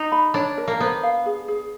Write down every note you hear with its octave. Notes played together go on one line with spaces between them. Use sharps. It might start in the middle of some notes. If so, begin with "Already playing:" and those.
Already playing: D#4
B5
D4 C#5
A#4
A#3
B3 C5
F5
G#4
G#4